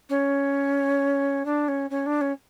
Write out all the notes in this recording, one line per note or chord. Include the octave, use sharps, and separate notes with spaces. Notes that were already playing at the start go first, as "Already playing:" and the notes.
C#4
D4
C#4
C#4
D4
C#4